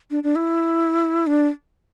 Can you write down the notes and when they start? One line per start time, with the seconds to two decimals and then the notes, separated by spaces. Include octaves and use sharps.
0.11 D4
0.23 D4
0.36 E4
1.27 D4